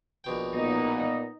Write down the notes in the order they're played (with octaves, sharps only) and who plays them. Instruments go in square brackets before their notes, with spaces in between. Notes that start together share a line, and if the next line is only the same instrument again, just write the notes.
[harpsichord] A#1 B2 G5
[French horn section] A#2 B3 [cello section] D#4